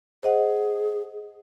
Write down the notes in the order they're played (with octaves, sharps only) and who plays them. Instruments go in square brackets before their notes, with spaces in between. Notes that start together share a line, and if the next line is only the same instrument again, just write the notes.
[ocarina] G#4 [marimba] C5 D#5 F#5